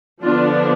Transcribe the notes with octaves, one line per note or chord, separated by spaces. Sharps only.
D3 F3 B3 D4 F4